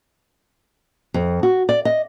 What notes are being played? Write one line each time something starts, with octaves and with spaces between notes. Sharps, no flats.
F2
F#4
D5
D#5